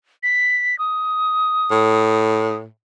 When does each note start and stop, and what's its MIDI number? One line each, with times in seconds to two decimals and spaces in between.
0.23 0.78 95
0.79 2.57 87
1.71 2.65 45